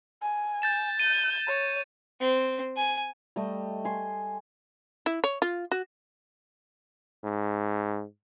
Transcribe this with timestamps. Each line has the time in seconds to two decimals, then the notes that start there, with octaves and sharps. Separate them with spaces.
0.22 G#5
0.62 G6 A6 E7
1.00 G6 D#7
1.47 C#5
2.20 C4
2.76 G#5
3.36 G3 A3 D#5
3.85 G#5 C6
5.06 E4
5.24 C#5
5.42 F4
5.72 F#4
7.24 G#2